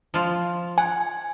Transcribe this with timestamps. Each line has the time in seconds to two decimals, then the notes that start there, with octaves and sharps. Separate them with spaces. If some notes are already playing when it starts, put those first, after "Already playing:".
0.14 F3 F4
0.78 F#5 G#5